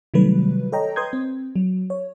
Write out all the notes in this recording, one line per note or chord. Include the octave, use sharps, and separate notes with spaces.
C3 D#3 F#3 G3 A3 B4
A4 C#5 D#5 G5 A#5
B4 C6 D#6 G6 G#6
C4
F#3
C#5